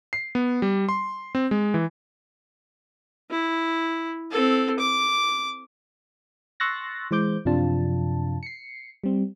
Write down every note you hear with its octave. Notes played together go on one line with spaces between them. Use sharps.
C7
B3
G3
C6
C4
G#3
E3
E4
C4 A4
D6
C6 C#6 E6 F#6 A6 A#6
E3 G#3 C5 D6 G6
F#2 C3 F3 D4 F4 A5
C7 C#7
G3 C4